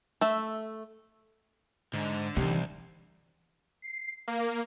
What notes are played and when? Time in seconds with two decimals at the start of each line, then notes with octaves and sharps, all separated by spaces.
0.21 A3 E5
1.94 G#2 D3
2.37 C2 C3 E3 D#4
3.82 C7
4.28 A#3